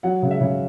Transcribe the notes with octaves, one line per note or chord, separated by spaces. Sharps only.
F#3 F#5
C#3
E5
C#3